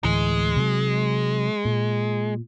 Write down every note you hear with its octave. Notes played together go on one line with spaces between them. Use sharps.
D2 A2 E3 G#3
C3 F#3
A#2